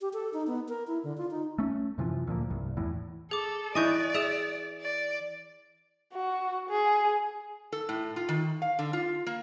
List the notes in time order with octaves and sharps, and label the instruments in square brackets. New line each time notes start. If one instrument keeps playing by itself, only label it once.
[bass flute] G4
A4
D#4
B3
A#4
E4
D3
F4
D#4
[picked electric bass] A3 C#4
F#2 C3 E3 F3
D2 A#2 F3 A#3
C2 G2
E2 A2 E3
[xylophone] G#4 D6 [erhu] A4
[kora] E3 D#5 [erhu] D5 [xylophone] G#5 C#6 G6
[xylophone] G#4 D#6 E7 [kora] E5
[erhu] D5
[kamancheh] F#4
G#4
[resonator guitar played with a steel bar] A4
A2
F4
D#3
F5
D3
F4
A#3